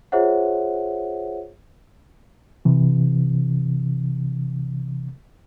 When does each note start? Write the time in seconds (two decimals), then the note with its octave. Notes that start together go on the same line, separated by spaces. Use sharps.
0.12 F4 G#4 C5 C#5 E5 F#5
2.65 C3 E3